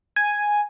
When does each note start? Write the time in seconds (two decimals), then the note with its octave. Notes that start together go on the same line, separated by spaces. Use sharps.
0.16 G#5